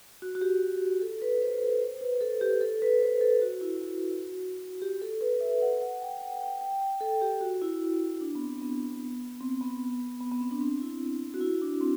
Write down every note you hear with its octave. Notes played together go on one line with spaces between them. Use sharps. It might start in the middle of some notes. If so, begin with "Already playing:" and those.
F#4
F#4
G4
A4
B4
C5
A4
C5
B4
A4
G4
A4
B4
C5
A4
F#4
E4
F#4
G4
A4
B4
E5
F#5
F#5
G5
F#5
G5
G5
G5
A4
G4
F#4
E4
D4
B3
C4
B3
C4
B3
B3
B3
C4
D4
C4
E4
F#4
E4
D4
C4